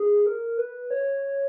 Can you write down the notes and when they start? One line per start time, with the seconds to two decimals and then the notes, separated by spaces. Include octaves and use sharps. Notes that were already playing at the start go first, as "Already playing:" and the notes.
Already playing: G#4
0.26 A#4
0.58 B4
0.91 C#5